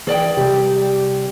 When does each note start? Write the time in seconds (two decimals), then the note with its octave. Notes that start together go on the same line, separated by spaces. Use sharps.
0.07 E3 G#4 D5 G5
0.37 C3 G3 G4